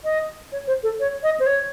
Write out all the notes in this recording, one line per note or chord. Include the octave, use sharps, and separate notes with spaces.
D#5
C#5
C5
A4
C#5
D#5
C5
C#5